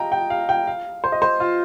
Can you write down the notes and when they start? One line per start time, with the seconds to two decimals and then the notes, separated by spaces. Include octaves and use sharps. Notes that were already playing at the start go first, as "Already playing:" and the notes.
Already playing: D#5 F5 G5 A#5
0.12 G5
0.30 F5
0.49 G5
0.67 F5
1.04 C5
1.12 D#5
1.22 C5
1.40 F4